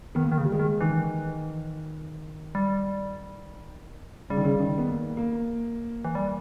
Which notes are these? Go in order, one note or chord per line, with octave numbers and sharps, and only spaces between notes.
D#3 B3
A#3
D#3
C#3
G3
G#3
D#3
D#3 E3
G3
C#3 G3
D#3
C#3
D#3
B3
A#3
A#3
E3
G3